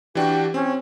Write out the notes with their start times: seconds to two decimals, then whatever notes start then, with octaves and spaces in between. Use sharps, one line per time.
0.15 E3 D4 F#4 G4
0.54 C4 C#4